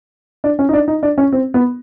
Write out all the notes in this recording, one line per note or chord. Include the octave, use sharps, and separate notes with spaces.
D4
C#4
D#4
D4
D#4
D4
C#4
C4
B3